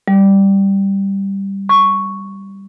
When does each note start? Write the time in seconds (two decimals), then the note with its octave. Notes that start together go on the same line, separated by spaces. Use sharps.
0.08 G3
1.69 C#6